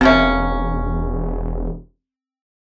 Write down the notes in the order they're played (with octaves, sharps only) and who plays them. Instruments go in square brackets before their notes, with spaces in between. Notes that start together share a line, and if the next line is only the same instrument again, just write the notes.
[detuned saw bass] E1 [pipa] D#3 A#3 C#4 [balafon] C4 E5